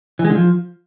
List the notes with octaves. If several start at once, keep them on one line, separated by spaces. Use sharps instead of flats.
E3
G#3
D3
F3